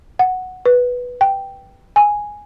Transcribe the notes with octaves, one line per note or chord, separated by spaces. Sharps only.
F#5
B4
G5
G#5